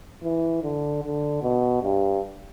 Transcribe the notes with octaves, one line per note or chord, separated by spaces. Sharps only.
E3
D3
D3
B2
G2